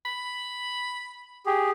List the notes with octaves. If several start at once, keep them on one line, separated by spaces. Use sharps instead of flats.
B5
G4 G#4